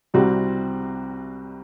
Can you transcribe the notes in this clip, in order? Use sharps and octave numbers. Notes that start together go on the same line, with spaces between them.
C2 C3 G3 C4 F#4